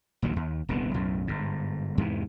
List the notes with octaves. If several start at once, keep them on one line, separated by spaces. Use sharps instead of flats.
A#1 D#2 D#3 F#3
D#2
D#1 C2 D3 B3
B1 F#2 A2
G1 G#2
E2 G#2 C3 E3